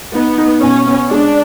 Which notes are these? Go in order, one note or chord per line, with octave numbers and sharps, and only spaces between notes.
B3 D#4
D#4
B2 C#4
B3
G#3 D4